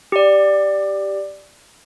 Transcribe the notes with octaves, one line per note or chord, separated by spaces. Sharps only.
G4 D5